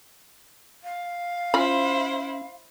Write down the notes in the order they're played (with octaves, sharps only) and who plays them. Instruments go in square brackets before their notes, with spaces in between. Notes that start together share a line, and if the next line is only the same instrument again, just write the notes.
[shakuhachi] F5
[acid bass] C#4 [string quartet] E4 C5 [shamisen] F4 B5